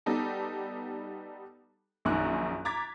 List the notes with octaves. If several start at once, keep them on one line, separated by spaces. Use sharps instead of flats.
G3 B3 D#4 A4
A#1 F#2 D#3 C#6 F#6
A#5 D6 G#6 A6 B6